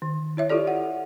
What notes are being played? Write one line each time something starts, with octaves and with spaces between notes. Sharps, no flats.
D#3
E4 C#5 E5
E4 F4 G4 A4 D5
F#5